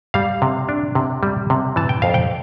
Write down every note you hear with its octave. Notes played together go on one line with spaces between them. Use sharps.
G3 F5
C3
D4
C3
G3
C3
E3 A5
G5
F2 F5
G5